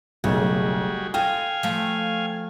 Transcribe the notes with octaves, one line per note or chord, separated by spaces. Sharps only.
F#1 B1 G3 A3 F#4 G#4
F4 A4 D#5 F5 G5 G#5
F3 A3